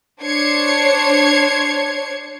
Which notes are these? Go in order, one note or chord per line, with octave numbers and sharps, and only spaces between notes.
D4 C5 C#5 G#6 C7 C#7